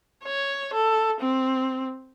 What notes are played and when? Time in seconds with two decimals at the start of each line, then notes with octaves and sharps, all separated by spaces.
0.24 C#5
0.74 A4
1.21 C4